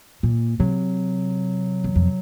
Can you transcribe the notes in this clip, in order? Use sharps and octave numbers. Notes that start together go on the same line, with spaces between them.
A#2
C3 F#3
E2
F2